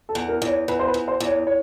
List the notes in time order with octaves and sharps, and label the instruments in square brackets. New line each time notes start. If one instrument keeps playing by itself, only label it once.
[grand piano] A4
[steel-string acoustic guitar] E2
[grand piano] A#4
[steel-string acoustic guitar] E2
[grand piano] C#5
[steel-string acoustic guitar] E2 [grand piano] B4
[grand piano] C5
B4
[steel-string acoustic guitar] E2
[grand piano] C5
[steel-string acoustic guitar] E2
[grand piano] C#5
C#5